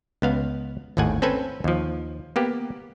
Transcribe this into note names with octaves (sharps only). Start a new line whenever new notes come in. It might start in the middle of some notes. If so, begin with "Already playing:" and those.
C#2 B3 F5
G#1 D#2 A2 F#5 G#5
C4 C#4 A4 B4 G#5
D#2 F3
A#3 B3 G4